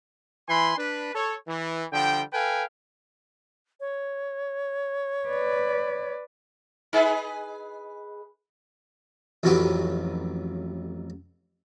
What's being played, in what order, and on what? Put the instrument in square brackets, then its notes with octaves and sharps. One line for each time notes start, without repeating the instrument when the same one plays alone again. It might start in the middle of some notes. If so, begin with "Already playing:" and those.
[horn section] E3 G#5 B5 C6
D4 B4
A4 C#5
E3
D3 F3 G3 G5
A4 B4 F5 G5 G#5
[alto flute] C#5
[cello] B4 D5
[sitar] D#4 G#4 B4
[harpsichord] A1 F2 A2 F#3 G4 B4